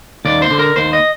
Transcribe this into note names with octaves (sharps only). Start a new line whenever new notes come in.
D#2 D5
C5
D3
A#4
D#2 C5
D#5